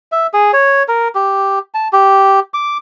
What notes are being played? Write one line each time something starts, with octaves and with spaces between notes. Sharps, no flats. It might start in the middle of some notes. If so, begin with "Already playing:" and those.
E5
G#4
C#5
A#4
G4
A5
G4
D6